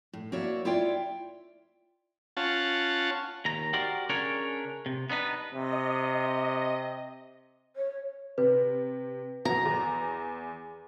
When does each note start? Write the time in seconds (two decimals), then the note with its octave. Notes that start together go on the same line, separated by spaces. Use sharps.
0.13 A2
0.32 A#3 E4 F#4 C#5 D5 E5
0.65 E4 F4 C#5 D5 E5 G5
2.37 C#4 F4 F#5 A5
3.45 D#2 A#5
3.73 F#4 G4 A#4 C5 D5
4.09 C#3 C#4 D4 A#4 C#5
4.86 C3
5.10 B3 D4 D#4 B4
5.55 C3 D#5
7.76 C#5
8.38 C3 B4
9.45 B2 F#3 A#5
9.65 E2